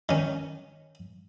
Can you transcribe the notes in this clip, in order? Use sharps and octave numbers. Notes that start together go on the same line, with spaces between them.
D#3 C#4